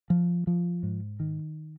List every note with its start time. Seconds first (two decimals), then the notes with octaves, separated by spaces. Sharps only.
0.10 F3
0.47 F3
0.83 G#2
1.20 D#3